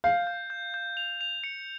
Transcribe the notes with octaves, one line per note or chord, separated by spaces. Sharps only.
F5 G6
G6
G6
G6
F7
F7
C#7